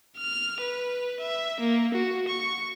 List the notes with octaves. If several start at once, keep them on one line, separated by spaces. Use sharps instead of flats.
F6
B4
E5
A#3
F#4
C#6